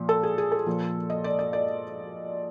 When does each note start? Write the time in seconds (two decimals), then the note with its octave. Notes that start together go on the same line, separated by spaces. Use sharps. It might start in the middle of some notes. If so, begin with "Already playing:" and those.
Already playing: A#2 F3
0.09 A4
0.23 G#4
0.38 G#4
0.52 A4
0.66 A#2 F3
1.10 D#5
1.24 D5
1.39 D5
1.53 D5